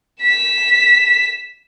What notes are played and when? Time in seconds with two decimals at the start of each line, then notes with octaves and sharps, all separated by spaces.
0.22 B6 E7